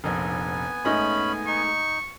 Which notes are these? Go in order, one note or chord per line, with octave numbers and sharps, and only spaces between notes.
F1 A#1 B3 G#5
G#2 A3 C#4 D#5 B5
D#4 C#6